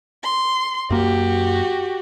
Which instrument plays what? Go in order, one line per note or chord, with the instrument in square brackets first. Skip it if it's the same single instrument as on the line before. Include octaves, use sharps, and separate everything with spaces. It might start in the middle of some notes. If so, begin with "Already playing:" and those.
[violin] C6
[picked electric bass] F#2 A#3 [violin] F#4 G4